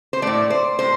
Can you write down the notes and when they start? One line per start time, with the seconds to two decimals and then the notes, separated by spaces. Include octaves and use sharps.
0.13 C5
0.22 A2 A3 D5
0.50 C5
0.79 A2 C5